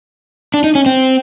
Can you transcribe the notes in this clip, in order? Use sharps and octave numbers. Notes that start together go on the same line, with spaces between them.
D4
D#4
C#4
C4